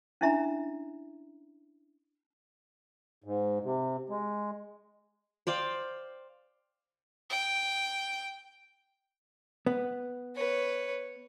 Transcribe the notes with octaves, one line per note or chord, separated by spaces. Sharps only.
C#4 D4 E4 E5 A#5 B5
G#2
C3
G#3
C5 D5 F5 G5
G5
B3
B4 C#5